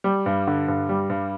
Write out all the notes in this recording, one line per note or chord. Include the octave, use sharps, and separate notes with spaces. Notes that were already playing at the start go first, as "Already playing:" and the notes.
G3
G2
D3
G2
G3
G2